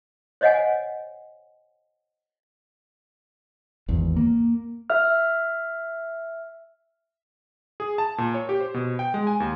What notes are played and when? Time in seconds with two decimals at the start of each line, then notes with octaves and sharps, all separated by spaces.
0.41 C5 C#5 D#5 F5 F#5 G#5
3.88 G#1 E2
4.16 A#3
4.90 E5 F6
7.80 G#4
7.98 A5
8.18 A#2
8.34 C#5
8.49 G4
8.60 C5
8.74 B2
8.99 G5
9.14 G#3
9.27 G#5
9.40 D#2